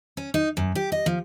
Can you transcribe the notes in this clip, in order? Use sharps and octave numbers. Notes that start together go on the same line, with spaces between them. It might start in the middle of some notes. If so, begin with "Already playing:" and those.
C#4
D#4
F#2
G4
D#5
F3